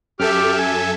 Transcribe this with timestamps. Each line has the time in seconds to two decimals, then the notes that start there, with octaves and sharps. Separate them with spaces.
0.19 F#2 G4 A4 E5 D6 F6
0.59 G#5